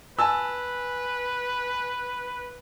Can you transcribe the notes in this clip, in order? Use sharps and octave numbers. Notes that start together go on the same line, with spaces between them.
B4 G#5 A5 E6